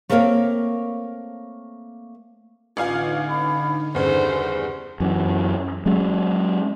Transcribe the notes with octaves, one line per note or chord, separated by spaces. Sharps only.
A3 A#3 C4 A#4 C#5 F5
A1 D3 D#4 F4 F5 G#5
B5
E2 G2 C#3 A4 C5
F#2 E3
F#3 G#3 C#4